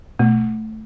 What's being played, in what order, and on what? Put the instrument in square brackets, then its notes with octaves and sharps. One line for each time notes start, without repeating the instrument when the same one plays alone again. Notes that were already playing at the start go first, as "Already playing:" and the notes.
[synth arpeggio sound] B2 [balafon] A3